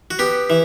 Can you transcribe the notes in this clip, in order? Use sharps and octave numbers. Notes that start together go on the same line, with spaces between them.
F#4
B3 G4
E3